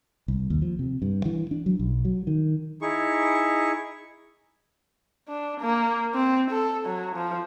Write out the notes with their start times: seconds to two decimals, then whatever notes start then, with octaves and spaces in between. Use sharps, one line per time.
0.28 C2
0.50 D#2
0.62 F3
0.79 C3
1.02 G2
1.25 E3
1.51 D4
1.66 F#3
1.79 B1
2.05 F#3
2.27 D#3
2.82 D#4 E4 G#4 C#6
5.29 D4
5.60 A#3
6.14 C4
6.51 A4
6.86 F#3
7.16 F3